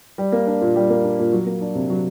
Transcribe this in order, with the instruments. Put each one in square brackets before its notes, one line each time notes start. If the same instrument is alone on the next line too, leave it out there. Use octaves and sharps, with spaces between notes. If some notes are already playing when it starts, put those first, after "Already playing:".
[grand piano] G3
A#3
D4
A#2
G3
A#3
D4
A#2
F#3
A#3
D4
C3
F#3